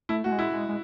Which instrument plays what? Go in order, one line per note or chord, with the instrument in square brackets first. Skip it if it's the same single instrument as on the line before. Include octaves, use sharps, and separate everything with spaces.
[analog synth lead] A3 [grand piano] E4
[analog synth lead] A3 [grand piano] F#4
[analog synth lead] G#3
[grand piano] E4
[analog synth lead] G#3
G#3